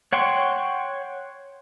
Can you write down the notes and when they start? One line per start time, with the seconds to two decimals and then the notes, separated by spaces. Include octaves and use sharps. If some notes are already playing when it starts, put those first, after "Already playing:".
0.13 C#5 F#5 G5 C6 C#6